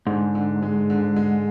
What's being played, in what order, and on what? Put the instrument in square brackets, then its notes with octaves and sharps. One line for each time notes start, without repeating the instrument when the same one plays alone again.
[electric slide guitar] G#2 [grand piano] D3
[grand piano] D3
G#3
D3
G#3